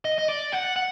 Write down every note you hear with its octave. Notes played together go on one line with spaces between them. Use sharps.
D#5
D#5
D5
F#5
F#5